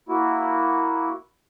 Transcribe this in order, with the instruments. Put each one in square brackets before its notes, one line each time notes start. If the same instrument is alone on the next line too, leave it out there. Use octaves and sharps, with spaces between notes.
[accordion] A#3 E4 F#4